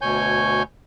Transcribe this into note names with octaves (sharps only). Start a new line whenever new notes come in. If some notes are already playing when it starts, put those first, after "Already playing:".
D2 B2 C#5 G#5 G6